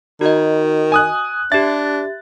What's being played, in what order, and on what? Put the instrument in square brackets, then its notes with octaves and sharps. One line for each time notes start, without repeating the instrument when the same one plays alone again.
[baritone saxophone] D#3 [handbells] F#4 D#5
[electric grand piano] G#5 D#6 F#6
[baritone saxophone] D4 [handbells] G4 E5 [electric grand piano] A6